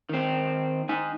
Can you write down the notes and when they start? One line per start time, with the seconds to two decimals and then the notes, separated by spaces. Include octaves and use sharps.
0.09 D#3 C4
0.89 D#4 G#5